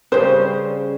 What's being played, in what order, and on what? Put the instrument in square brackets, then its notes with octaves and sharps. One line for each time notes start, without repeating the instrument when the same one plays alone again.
[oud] C#3 G3 [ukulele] C5